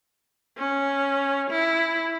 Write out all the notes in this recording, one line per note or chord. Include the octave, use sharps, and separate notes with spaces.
C#4
E4